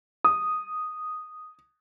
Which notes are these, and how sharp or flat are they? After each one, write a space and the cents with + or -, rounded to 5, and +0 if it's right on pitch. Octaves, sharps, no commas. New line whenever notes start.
D#6 -5